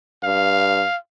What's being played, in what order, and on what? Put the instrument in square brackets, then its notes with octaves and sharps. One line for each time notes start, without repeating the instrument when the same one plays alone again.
[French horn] G2 [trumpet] F5